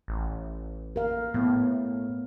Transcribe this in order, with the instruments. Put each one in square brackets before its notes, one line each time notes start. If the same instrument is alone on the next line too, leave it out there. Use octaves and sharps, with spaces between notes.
[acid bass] A1
[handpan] A#4 F5
[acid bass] A2 [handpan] A3 B3